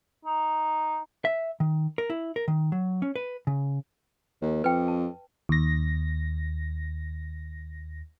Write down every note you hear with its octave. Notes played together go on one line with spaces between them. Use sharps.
D#4
E5
D#3
A#4
E4
A#4
D#3
F#3
C#4
B4
C#3
D#2
F2 B4 G5
A5
D#2 A#6